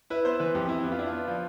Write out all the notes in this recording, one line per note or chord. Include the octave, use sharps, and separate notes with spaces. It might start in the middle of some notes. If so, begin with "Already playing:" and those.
E4 B4
B3 C5
E3 B4
F2 G4
E4
B3 G4
F4
D4 E4
F4
B3
F3